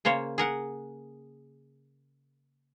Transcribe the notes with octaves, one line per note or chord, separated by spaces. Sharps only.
C#3 A#3 C5 C#5
G#4 A#4 F#5